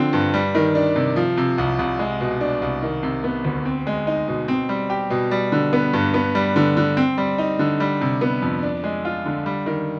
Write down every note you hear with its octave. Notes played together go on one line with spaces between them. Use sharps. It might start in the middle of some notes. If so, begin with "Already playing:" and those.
Already playing: D3 F3 C4
G2
G3
D#3
D4
C3
F3
C3
C2
C2
G#3
B2
D4
C2
D#3
C3
B3
D2
C4
G#3
D#4
B2
C4
G3
G4
B2
G3
D3
B3
G2
B3
G3
D3
D3
C4
G3
D#4
D3
G3
C3
B3
F2
D4
G#3
F4
D3
G3
D#3